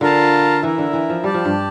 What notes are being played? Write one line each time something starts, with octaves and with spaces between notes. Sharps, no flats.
D3 F4 A#4 F5 A5
E3 E4 A#4 E5
D3
E3
F3
G3 G4 D5 A5
F3
G2